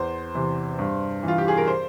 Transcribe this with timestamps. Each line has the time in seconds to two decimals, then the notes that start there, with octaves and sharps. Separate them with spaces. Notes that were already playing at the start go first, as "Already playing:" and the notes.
Already playing: E2 C5
0.34 C3 E3
0.79 G2
1.23 E3
1.28 F4
1.38 G4
1.48 G#4
1.58 A#4
1.68 C5